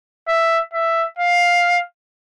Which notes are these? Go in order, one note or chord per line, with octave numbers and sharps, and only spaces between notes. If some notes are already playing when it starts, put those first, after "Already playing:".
E5
E5
F5